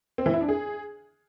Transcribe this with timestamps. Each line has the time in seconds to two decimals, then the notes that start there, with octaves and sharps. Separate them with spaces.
0.18 C4
0.26 E3
0.33 E4
0.41 D4
0.49 G#4